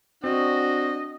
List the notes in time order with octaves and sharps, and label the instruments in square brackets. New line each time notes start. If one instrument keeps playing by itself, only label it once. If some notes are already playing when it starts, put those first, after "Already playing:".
[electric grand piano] C4 [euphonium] D4 [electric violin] F#4 [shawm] D#5